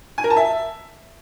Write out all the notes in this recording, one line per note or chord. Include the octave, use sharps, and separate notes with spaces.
G#5
A#4
A5
E5